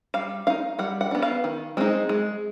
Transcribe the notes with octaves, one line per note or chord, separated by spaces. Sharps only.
G3 F5
C4 D#4 F5
G3 F#5
F#5
B3 D4
F5
D#3
G#3 C4 D#4
G#3